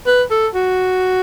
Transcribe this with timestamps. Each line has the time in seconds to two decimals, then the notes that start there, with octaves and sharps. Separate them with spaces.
0.07 B4
0.31 A4
0.54 F#4